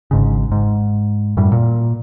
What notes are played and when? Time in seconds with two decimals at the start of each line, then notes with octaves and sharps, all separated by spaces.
0.11 G#1 G#2 C#3
0.52 G#2
1.37 F#2 A2 G3
1.52 A#2